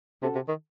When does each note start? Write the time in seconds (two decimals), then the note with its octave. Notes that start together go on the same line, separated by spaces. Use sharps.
0.22 C3 C#4 F#4 A4 C5
0.35 C3
0.48 D#3